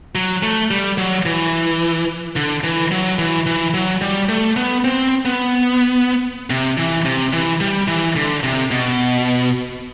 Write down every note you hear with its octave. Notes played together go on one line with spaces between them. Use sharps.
F#3
A3
G3
F#3
E3
D3
E3
F#3
E3
E3
F#3
G3
A3
B3
C4
B3
C3
E3
C3
E3
G3
E3
D3
C3
B2